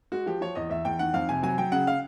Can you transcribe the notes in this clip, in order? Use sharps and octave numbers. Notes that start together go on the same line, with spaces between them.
G#3 F#4
F3 G4
F3 C#5
E2 D#5
E2 E5
E2 G5
D#3 F#5
F2 F5
C3 G#5
F#3 G#5
F#3 G5
C#3 F#5
F5